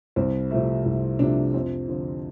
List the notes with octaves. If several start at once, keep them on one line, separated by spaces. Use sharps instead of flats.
C2 C4
C3 F3 A3
C2
C3 F3 A3 D4
F2 C4
D3 F3